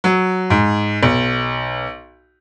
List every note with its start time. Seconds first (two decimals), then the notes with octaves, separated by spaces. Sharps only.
0.04 F#3
0.50 G#2
1.03 B1